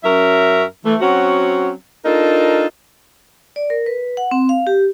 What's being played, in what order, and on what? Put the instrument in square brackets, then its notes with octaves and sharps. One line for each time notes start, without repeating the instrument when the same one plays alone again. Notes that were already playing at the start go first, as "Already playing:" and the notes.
[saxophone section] F#2 F#3 C#4 A#4 E5
E3 A3
F#3 C4 C#4 F#4
D4 D#4 F4 A4 A#4
[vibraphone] D5
A#4
B4
F#5
C4
F5
G4